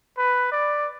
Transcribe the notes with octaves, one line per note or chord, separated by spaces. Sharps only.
B4
D5